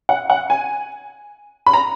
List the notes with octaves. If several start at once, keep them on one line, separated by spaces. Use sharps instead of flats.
F#5
F#5
G#5
B5
A#5